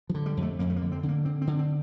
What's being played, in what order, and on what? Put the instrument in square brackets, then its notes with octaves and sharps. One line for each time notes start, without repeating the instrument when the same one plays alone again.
[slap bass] F3
D3
G3
F2
A3
F2 A#3
A3
A#3
D3
C4
D3
A#3
D3 C4
C4
D3
C4